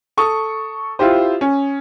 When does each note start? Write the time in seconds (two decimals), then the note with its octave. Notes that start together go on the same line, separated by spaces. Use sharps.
0.17 A4 C#6 D#6
0.99 E4 F4 G4 C5
1.41 C#4